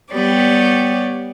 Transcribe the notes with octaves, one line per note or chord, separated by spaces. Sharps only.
G3 B3 G4 C#5 D5